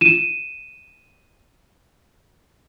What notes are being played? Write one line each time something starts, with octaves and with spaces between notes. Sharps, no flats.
D#7 E7